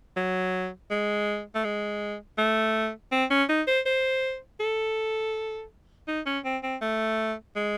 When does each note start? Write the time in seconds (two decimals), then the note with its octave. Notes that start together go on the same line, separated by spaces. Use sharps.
0.17 F#3
0.91 G#3
1.55 A3
1.64 G#3
2.38 A3
3.12 C4
3.31 C#4
3.49 D#4
3.67 C5
3.86 C5
4.60 A4
6.08 D#4
6.26 C#4
6.45 C4
6.63 C4
6.82 A3
7.56 G#3